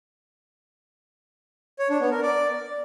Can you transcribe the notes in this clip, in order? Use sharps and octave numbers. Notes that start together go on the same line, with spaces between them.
C#5
D4
B3
A#4
D5